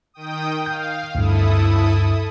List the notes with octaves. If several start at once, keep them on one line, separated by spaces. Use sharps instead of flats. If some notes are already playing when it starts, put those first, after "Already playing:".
D#3 G5 D#6
F5 G6
D2 G2 E4 A4 D#6